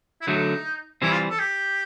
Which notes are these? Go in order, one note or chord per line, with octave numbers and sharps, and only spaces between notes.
E4
D3 F#3 A3 D#4
E3 G3 C4 E4
F4
A4
G4